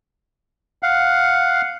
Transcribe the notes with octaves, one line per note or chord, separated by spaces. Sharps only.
F5 F#5